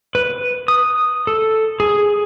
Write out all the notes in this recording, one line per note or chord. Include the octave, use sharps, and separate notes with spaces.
B4
D#6
A4
G#4